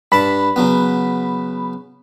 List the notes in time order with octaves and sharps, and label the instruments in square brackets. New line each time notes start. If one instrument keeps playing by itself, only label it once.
[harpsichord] G2 A5 D6 [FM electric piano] B5
[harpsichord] C#3 F#3 B3